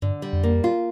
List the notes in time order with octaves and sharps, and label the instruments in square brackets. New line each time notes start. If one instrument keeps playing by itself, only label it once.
[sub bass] G2 [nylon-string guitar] D3
[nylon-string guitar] G3
[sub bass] F2
[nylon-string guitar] A#3
F4